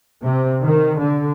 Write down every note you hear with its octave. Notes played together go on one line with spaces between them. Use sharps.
C3
D#3
D3